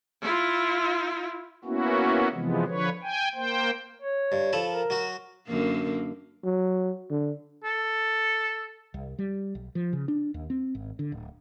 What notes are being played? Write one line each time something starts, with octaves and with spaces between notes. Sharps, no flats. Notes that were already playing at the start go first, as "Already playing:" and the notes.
E4 F4
A#3 B3 C#4 E4 F#4
C3 E3 F3 G#3 B3
D3 F3 B4 C#5
G5 G#5
A#3 C5 G5
C#5
G2
F3 A4 B5
A#4
F#3 F#4
F#2 D3 A#3
F#3
D3
A4
C2
G3
B1
F3
C#3
D4
D#2
C4
G#1
D3
D1